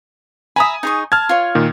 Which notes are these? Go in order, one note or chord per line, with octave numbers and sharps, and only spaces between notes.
E5 G#5 A#5 B5 D#6
D#4 G#4 C#6
A5 F6 G#6
F4 C#5
A#2 D#3